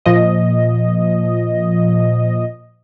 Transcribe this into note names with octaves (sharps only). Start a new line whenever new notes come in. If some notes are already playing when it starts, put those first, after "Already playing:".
A#2 F3 D#5